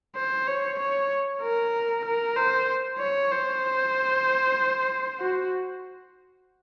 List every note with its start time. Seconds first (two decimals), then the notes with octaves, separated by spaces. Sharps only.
0.16 C5
0.48 C#5
0.80 C#5
1.42 A#4
2.05 A#4
2.37 C5
2.99 C#5
3.31 C5
5.20 F#4